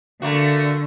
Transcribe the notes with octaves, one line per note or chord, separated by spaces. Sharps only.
D3 A3 A#3 F#4